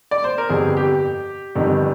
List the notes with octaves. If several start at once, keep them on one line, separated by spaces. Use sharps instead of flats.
D5
C5
A#4
G1 F2 C3 G#4
G4
G1 F2 D#3 G3